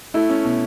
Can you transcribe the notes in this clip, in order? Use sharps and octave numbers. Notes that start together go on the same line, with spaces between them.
A3 E4
C#4
B2